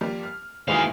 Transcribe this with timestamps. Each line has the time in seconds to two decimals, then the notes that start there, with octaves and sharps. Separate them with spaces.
0.01 F3 G3 A#3
0.23 F6
0.68 D#2 E3 G#3 F#4 C5 E5 F5